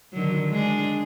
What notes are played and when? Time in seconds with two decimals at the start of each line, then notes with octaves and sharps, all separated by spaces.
0.13 D3 D#3 F#3
0.50 G#3 D4 G#4